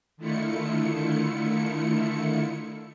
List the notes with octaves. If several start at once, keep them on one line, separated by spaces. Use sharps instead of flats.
D3 D#3 A3 E4 F4 C#7